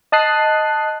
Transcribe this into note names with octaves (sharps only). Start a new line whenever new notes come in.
D#5 A5 D#6 F#6 C7